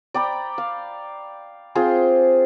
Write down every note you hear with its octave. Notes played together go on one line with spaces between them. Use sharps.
D5 G5 A#5 B5
F5
C4 F4 G#4 C5